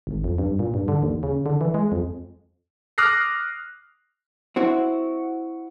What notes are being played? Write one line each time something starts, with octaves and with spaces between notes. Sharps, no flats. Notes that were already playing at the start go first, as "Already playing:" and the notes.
G#1
F2
G2
A#2
G2
D3
D#2
C#3
D3
E3
G#3
F2
D6 D#6 F6 F#6 A#6 C7
C4 E4 F#4